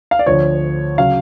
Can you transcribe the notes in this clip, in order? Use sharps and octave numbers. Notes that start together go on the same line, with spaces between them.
F5
D5
D2 D3 F3 C#5
C#3 F#3 F5